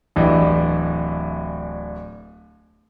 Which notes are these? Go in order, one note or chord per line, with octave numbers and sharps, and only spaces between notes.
D1 E3 D4 G4 D#5 E5